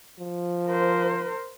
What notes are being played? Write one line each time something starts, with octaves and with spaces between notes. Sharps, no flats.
F3
A#4 C5